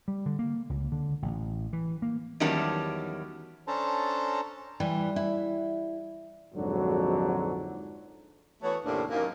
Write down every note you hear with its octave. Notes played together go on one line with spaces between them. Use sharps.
G3
D3
A#3
C#2
D3
A1
E3
A#3
E2 D#3 F#3 G3 C#4 A5
C#4 D4 A4 C5 A5 A#5
E3 G3
E4
A#1 F2 G#2 D3 F#3 F#4
E3 A3 B3 F#4 C#5
D#2 A2 C3 A#3 C#4 D4
F#2 A#3 D#4